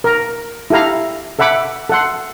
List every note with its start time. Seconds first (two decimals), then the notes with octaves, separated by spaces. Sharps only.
0.04 A#4 A#5
0.70 E4 G4 A4 F5 A#5
1.39 A4 E5 F#5 B5 D6
1.89 A4 F#5 C6